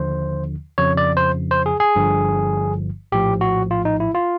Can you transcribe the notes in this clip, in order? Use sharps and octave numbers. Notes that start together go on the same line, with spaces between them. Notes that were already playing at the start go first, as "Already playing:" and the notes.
Already playing: D#2 D3 F3 C5
F2 C#3 F3 C#5
D5
C5
C5
G#4
G#4
G1 G2 D3 F3
A#1 A2 F3 G4
F#4
F4
D#4
E4
F4